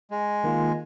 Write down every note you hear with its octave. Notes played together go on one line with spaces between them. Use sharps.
G#3
D#3 A#3 F4